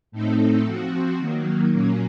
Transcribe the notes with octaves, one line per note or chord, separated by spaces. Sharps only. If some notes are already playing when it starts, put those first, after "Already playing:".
A2 A3 C4 D#4 A4
F3 C4 F#4
D#3 F#3 A#3
A#2 F#3 A#3 C#4